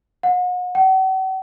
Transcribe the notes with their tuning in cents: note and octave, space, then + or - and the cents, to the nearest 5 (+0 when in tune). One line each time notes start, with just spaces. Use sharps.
F#5 -40
F#5 +45